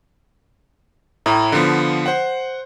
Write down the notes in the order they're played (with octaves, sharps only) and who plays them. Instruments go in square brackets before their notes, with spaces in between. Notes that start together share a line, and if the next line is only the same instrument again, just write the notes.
[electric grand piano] A2 E4 A#5
D3 F3 B3
C5 F#5